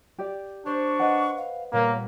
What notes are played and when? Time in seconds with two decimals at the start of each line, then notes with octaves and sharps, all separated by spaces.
0.18 G4 D5
0.66 D4 C5 C#5 C#6
0.99 B4 D#5 F#5
1.37 F5
1.73 A#2 G3 A#3 B3 C#5